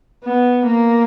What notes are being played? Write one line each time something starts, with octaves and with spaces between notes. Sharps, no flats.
B3
A#3